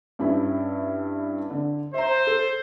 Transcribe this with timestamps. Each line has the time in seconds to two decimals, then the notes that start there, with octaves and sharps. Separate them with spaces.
0.19 G2 C#4 E4
1.50 D3
1.94 C5 E5 A#5
2.27 A4